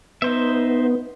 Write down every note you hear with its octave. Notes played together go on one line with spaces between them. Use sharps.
B3 D#4 C5 E5